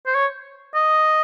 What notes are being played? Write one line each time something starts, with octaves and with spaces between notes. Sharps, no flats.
C5
C#5
D#5